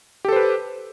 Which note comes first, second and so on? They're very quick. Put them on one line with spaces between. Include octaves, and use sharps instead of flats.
G4 A4 C5 B4